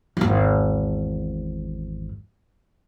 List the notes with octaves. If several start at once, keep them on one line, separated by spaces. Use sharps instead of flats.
G#1 E2